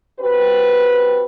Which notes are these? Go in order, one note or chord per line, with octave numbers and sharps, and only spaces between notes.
C4 F#4 G4 B4